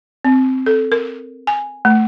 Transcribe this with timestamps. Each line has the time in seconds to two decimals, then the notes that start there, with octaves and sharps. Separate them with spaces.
0.25 C4
0.66 A4
0.92 A#4
1.47 G#5
1.85 A3